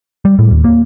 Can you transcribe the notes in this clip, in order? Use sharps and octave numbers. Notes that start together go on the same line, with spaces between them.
G3
A2
D#2
A#3